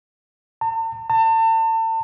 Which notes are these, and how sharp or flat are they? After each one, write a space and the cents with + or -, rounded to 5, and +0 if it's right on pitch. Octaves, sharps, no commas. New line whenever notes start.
A5 +45
A5 +35